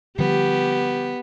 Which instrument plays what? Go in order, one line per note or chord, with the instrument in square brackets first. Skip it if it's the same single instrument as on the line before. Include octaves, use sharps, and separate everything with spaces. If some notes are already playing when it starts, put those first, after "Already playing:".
[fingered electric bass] D3 F3 G3 [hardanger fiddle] B3 [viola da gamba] G4